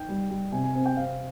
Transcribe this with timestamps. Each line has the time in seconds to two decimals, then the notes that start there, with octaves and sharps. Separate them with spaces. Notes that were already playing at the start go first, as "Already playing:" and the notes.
Already playing: D#4 G5
0.08 G3
0.30 G3
0.52 C3 G#5
0.64 G#5
0.74 C4 G#5
0.85 G5
0.96 C4 F5